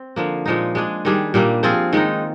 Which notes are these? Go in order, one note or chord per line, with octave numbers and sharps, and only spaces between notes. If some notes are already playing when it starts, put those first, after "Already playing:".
Already playing: C4
D3 F3 A#3
A#2 F3 G#3 D#4
G#3 D4 G#4
D#3 G3 D4 G#4
A#2 G3 A#3 D4
F3 C4 F4 G#4
D#3 G#3 D#4